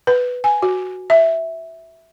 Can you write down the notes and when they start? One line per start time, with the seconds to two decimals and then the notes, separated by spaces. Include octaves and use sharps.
0.07 B4
0.44 G#5
0.62 F#4
1.10 E5